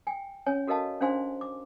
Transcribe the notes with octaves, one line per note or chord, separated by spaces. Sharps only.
G5 G#5
C#4 C#5 G#5
F#4 A4 A#4 D#5 F5 A5
C#4 D4 C5 F5 G#5 C6
D6